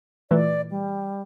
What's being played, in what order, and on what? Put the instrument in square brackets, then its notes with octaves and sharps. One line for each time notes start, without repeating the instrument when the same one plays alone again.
[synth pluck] A#2 E3 A3 [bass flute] D5
[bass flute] G3